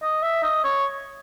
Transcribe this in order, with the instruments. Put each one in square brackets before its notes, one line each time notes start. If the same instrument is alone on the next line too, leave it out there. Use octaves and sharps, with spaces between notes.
[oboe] D#5
E5
D#5
C#5